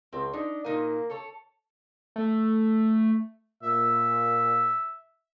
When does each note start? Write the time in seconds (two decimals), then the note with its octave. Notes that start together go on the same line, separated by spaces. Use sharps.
0.13 C#2 C4
0.33 D4 D#4
0.64 A#2 A#3 D#4 G#5
1.10 A4 C#5
2.16 A3
3.63 A#2 E5